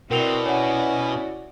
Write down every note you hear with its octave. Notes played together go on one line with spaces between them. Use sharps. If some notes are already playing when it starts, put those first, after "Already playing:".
B2 C4 E4 F#4 A#4 D5 F7 G7
C#4 C#5 F#5